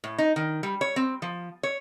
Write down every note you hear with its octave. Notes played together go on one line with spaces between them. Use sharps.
A2
D#4
D#3
G3
C#5
C4
F3
C#5